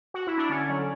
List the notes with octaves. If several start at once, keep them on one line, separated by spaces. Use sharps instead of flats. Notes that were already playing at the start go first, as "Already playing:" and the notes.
F#4
E4
D4
D3 C#4
F#3